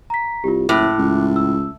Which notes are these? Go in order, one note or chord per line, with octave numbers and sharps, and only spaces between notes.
A#5 B6
C2 F4 G4
F#1 A2 D6 F#6
C#2
E6